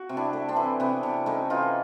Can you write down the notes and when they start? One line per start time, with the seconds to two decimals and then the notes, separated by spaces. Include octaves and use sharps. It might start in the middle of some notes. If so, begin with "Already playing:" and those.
Already playing: F#4
0.09 C3
0.17 D4 E4
0.33 A3
0.49 C4 D4
0.56 E3
0.80 C3 B3
1.03 C3
1.26 A3 C#4 D#4
1.50 E3 D#4 F4